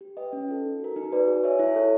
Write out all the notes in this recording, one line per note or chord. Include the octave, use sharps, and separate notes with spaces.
G4
B4 D#5 G5
C#4
F4 A4
D#4
F#4 A#4
D#4
F#4 B4 D5
G#4
C#5 E5 G#5
E4
A4 C#5